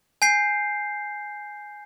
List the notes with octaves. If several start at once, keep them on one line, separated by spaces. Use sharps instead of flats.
G#5 G6 C7